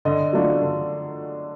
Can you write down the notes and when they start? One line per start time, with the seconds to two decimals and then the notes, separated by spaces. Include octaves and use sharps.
0.05 D3 D#5
0.33 F#3 A3 D4 F4
0.62 D3